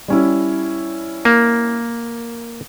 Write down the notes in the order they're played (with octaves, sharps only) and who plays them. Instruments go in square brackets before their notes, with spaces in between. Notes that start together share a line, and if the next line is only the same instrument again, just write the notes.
[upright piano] G3 C#4 E4
[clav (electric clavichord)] A#3